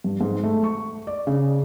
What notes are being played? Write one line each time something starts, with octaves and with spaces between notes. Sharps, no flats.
G2
G#2
A3
C#6
D5
C#3